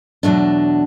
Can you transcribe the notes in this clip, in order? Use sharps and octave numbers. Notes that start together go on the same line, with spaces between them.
E2 B2 F#3 A3 D4